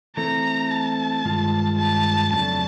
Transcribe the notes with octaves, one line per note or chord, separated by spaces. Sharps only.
E3 A3 C4 E4 A4 A#5
A5
G2 D#3 G#3 F4
A5
F2 C#3 F#3 A3 D4 A5